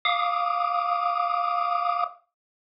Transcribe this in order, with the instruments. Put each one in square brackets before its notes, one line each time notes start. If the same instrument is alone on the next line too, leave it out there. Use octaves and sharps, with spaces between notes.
[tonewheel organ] F5 D6 D#6